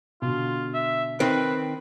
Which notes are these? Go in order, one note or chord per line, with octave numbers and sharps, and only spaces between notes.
B2 D3 F4
E5
D#3 C4 B4